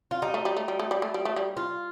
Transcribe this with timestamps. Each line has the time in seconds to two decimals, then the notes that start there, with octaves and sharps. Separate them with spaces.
0.11 F4
0.22 G3 D#4
0.34 A3
0.45 G3
0.57 A3
0.68 G3
0.79 A3
0.91 G3
1.02 A3
1.14 G3
1.25 A3
1.36 G3
1.57 F4